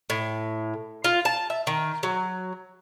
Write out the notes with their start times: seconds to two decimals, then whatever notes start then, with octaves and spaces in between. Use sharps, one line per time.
0.10 A2
1.04 F4
1.25 A5
1.50 E5
1.67 D#3
2.03 F#3